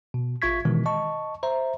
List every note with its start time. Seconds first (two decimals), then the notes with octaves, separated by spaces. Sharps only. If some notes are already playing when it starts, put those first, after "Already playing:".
0.14 B2
0.42 A1 F4 E5 C#6 G#6 B6
0.65 B2 D#3 E3 G#3
0.86 D#5 A5 C#6
1.43 C5 E5 A#5